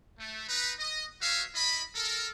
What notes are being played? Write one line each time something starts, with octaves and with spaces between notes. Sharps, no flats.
A3
D#4 B4
D#5
F#4 B4 C#5 E5 F5
E4 D#5 B5
A4 A#4